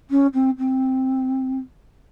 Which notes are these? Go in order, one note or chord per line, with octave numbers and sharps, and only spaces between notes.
C#4
C4
C4